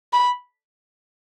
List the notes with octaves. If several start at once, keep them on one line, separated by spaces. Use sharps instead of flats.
B5